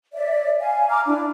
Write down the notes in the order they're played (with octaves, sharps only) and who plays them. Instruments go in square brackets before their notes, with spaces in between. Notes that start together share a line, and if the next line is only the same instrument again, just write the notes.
[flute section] C#5 D5 E5
F5 G#5
A#5 D6 F6
D4 E4